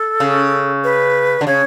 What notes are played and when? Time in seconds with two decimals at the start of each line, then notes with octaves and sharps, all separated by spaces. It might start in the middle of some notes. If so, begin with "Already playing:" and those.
Already playing: A4
0.20 C#3
0.84 B4
1.41 D3
1.47 C#3 C#5